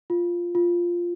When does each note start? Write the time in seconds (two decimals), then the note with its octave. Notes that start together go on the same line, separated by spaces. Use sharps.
0.10 F4
0.55 F4